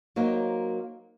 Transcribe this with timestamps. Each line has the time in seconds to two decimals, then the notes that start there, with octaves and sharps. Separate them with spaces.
0.16 F#3 A#3 D#4 C5 C#5